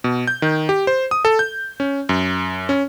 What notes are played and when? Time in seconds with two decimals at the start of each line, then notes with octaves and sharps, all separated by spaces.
0.04 B2
0.27 G6
0.42 D#3
0.69 G4
0.87 C5
1.11 D#6
1.25 A4
1.39 G6
1.80 C#4
2.09 F#2
2.69 C#4